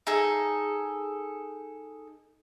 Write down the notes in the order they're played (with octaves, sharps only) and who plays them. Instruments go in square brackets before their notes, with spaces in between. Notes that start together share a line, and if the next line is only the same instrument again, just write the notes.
[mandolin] D#4 G#4 A4